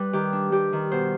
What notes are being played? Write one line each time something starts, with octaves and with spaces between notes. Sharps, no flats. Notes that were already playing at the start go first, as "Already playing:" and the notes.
Already playing: G3 B4
D#3 G4
D4
G3 G4
D#3
B2 C5